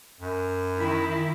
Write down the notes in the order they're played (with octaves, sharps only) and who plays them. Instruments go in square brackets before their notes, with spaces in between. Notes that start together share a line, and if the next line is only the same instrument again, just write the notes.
[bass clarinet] F#2
[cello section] D#3 E4